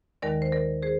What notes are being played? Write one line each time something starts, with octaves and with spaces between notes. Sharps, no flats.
D#2 D#3 G#3 A#4 D5
C5
A#4 D5
G#4 C5